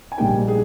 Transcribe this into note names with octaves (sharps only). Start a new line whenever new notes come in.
G#5
A#1 G#2 G3 A#3 D#4 G5
G#4